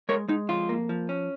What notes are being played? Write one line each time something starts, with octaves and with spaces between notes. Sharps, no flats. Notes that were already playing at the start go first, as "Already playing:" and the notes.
G#3 A#4 C#5
G#3 D#4
F2 F4
A#3
F3
C#4